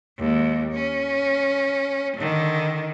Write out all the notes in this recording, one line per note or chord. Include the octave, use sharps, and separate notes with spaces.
D#2 G#3
C#4
D3 D#3